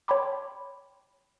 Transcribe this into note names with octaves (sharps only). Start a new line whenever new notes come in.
C#5 G5 A5 B5 C6 D6